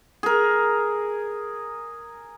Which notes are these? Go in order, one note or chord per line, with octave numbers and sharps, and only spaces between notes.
G#4 A#4